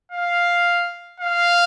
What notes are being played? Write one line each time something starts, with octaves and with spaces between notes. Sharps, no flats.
F5
F5